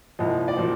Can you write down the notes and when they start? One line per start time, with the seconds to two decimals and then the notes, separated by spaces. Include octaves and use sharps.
0.19 C2 A#2 F3 D#5
0.48 D5
0.57 A#2 F3 C5